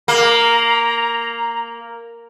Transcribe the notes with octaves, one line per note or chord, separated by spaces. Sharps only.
A#3 A#5